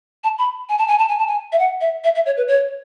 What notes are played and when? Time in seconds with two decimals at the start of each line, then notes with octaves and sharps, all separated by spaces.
0.24 A5
0.39 B5
0.69 G#5
0.78 A5
0.88 G#5
0.99 A5
1.09 G#5
1.19 A5
1.27 G#5
1.52 E5
1.59 F#5
1.81 E5
2.04 E5
2.15 E5
2.26 C#5
2.37 B4
2.48 C#5